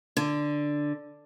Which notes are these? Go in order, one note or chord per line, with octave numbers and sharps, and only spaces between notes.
D3